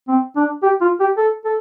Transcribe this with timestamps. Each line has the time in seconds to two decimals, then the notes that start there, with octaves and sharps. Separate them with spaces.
0.08 C4
0.36 D4
0.63 G4
0.81 F4
1.00 G4
1.17 A4
1.45 A4